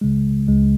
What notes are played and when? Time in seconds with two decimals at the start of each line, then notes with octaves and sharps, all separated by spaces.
0.01 C#2 C#3 G#3
0.48 C#2 C#3 G#3